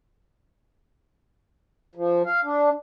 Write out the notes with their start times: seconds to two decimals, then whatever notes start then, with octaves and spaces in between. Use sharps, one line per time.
1.95 F3
2.25 F5
2.44 D4